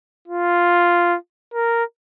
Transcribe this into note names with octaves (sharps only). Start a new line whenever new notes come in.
F4
A#4